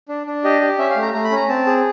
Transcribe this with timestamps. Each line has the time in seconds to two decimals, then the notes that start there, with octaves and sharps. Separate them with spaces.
0.09 D4
0.27 D4
0.44 G4 D#5
0.61 G4
0.78 C#4 E5
0.90 F5
0.96 A3
1.02 A#5
1.13 A3 A#5
1.24 B5
1.31 C#4 A#5
1.49 C4 A5
1.67 G#4